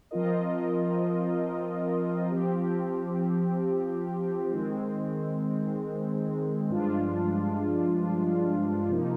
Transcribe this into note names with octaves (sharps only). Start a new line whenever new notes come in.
F3 C4 F4 A#4 D#5
F3 C4 G4
D#3 G#3 C4
G2 F3 G#3 D4 F4
C3 F3 A#3 D#4